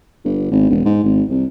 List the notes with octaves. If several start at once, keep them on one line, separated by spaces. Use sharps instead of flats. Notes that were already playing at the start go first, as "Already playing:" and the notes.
G1
G#1
E1
G#2
G#1
C2